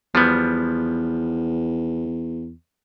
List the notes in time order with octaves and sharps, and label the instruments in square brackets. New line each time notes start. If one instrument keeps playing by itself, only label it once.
[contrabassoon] E2 [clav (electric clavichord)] F3 G3 B3